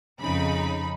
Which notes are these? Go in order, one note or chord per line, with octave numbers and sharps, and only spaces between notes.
F2 C#3 D#4 B5